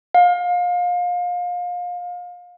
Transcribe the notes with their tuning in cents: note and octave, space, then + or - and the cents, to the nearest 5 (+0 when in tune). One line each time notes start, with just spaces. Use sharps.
F5 +30